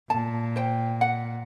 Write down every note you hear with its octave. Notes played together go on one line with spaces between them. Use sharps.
A#2 A5
C5 G5
F#5